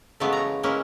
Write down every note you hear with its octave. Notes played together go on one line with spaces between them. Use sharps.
C#3 E3 F#3 G#3 A3 B3
C#5 A#5
E3 G#3 A#3 C#4 E4